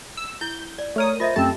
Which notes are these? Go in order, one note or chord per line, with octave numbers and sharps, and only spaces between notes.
E6
E4 G6
D5
A3 A#4 C#5 D#6
F4 C5 D#5 E5
F#2 A3 C4 G4 A5